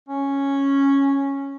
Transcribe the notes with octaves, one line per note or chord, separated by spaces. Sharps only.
C#4